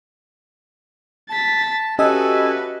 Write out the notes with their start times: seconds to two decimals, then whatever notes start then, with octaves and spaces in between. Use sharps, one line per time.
1.30 A5 A6 B6
1.99 C#4 F#4 G4 A4 B4 D#5 E5 G#5